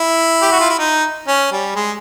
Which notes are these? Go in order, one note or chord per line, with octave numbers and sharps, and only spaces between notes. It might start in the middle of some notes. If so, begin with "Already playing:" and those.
Already playing: E4
G4
F#4
F4
E4
D#4
C#4
G3
G#3